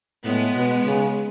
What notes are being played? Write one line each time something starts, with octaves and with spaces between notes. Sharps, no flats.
A2 G#3 B3
B2
C#3